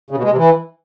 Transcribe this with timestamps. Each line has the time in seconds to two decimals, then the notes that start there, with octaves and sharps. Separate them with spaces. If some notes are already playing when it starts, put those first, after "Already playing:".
0.11 C#3
0.17 B2
0.24 G#3
0.31 C3
0.37 E3